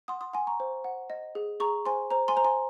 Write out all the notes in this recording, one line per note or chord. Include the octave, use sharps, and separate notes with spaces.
F#5 C6 D#6
C6 D#6
F#5 G#5 C6
A#5 C#6
C5
F#5
D#5
G#4
G#4 A#5 C#6
C5 G#5 C6
C5 A#5
G#5 C6
C5 A#5
G#5 C6